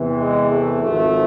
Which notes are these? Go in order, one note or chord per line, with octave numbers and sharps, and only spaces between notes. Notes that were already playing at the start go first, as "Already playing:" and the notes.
Already playing: E2 C3 E3
G#3
A3
G#1 G#2 F3 A3